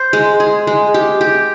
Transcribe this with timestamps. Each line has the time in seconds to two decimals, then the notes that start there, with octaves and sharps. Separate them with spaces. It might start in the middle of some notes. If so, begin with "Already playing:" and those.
Already playing: C5
0.13 G#3
0.40 G#4
0.67 G#3
0.94 G4
1.21 G4